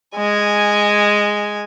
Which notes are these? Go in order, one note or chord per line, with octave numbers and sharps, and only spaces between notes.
G#3 G#5